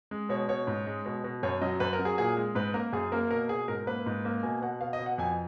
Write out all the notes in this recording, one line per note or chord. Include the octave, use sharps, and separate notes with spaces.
G#3
B2 C#5
B2 C#5
G#2
G#3
B2
B2
F#2 C#5
F#3 D#5
F#2 B4
A#4
F#3
G#4
A#2 G#4
G#3
G#2 B4
A#3 A#4
F#2 G#4
A#3 A#4
B2 A#4
B2 G#4
G#2 A#4
A#3 B4
G#2
A#3
B2 G#5
B2 F#5
B2 F5
D#5
B2
F#5
F2 G#5